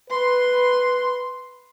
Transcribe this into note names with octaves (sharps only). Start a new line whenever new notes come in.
B4 C6